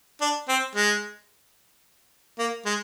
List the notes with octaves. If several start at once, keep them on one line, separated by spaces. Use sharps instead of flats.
D4
C4
G#3
A#3
G#3